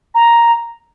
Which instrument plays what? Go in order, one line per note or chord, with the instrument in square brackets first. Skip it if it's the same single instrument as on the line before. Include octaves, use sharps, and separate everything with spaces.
[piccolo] A#5